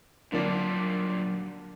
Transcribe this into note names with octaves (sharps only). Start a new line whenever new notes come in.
A#2 D3 F#3 G3 A#3 D4